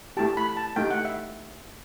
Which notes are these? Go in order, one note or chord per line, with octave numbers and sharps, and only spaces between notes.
A3 E4 G4 A5
B5
A5
A3 D#4 G4 G5
F#5
E5